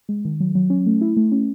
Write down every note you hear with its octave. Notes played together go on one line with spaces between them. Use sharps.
G#3
D#3
F#3
F#3
C#4
A3
E4
A3
C#4